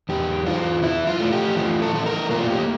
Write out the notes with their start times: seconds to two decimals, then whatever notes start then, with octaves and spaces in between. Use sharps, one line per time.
0.09 E2 G4
0.46 E3 F4
0.82 E3 E4
1.07 F4
1.20 A3
1.32 G4
1.56 E3 F4
1.82 A4
1.94 A3 A4
2.06 A#4
2.31 A#3 F4
2.50 G4